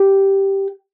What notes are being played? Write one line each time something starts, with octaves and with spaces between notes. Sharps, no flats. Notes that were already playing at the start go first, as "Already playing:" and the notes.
Already playing: G4